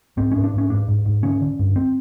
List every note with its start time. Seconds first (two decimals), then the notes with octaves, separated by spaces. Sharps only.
0.17 G#2 C4
0.31 G#2 C#4
0.44 D4
0.53 G#2 C#4
0.70 G#2 D4
0.88 G#2
1.06 G#2
1.23 D3 C#4
1.42 D3
1.59 G2
1.76 C4